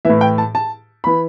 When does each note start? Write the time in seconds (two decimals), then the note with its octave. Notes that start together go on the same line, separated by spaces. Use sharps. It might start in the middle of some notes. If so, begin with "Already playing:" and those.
0.05 A2 E3 E5
0.21 G5
0.38 A5
0.55 A5
1.04 E3 B5